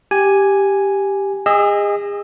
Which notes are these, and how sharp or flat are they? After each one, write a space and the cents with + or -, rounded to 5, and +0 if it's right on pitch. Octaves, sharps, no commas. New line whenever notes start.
G4 +0 G#5 +0
G#4 -35 D#5 +0 E6 +0